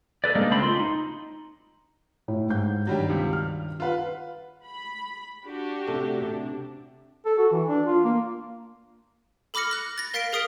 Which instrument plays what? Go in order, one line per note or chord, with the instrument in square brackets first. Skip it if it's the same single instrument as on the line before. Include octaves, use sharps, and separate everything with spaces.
[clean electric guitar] A4 B4 D5
G#3 A#3 D4 D#4 G#4 A#4
C#2 A3 A#3 C4 C5 B5
F4 C6
D#4
[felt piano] A2
G#2 G6
[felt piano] G2 D#3 [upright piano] F#3 G3 G4
[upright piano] C#2 C3
F6
[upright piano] F4 B4 [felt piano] F5 F#5
[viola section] B5
D4 F#4 G4
[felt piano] C3 A3
[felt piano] C3 [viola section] D4
[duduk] A4
F#4
E3
D4
F4
A#3
[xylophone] A4 B5 D6 F6 A#6 C#7
F#6 A#6
A6 A#6
A#4 F5 A6 B6 C7 D7
G#4 A#4 D#6 C7 D7